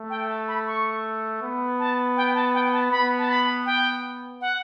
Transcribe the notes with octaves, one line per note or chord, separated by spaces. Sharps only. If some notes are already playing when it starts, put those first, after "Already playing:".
Already playing: A3
G5
A5
B5
C#6
B3
A5
G5
A5
G5
A5
B3 B5
A5
B5
G5
F#5